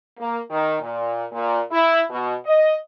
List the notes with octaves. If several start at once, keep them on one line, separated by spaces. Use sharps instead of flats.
A#3
D#3
A#2
A#2
E4
B2
D#5